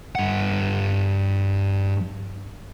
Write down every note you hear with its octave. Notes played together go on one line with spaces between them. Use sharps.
G2 F#5